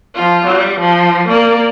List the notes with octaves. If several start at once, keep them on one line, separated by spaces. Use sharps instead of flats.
F3 F4
G3
F3
A#3 D5